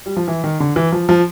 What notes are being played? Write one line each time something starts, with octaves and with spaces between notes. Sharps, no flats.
G3
F3
E3
D#3
D3
E3
F3
F3